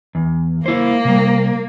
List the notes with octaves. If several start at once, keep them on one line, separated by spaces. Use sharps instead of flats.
E2
A#3 E4 C5
C3 G3